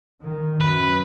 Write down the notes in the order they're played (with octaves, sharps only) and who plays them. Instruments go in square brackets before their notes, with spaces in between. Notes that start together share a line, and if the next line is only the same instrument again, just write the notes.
[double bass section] D#3
[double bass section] F#2 [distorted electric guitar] B4